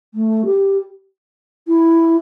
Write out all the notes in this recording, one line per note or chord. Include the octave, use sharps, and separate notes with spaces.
A3
G4
E4